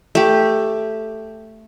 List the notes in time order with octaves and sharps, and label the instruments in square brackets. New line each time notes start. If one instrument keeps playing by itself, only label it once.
[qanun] A3 G4